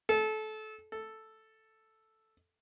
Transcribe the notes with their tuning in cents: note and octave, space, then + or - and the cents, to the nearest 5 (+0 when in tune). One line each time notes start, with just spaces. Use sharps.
A4 -25
A4 +0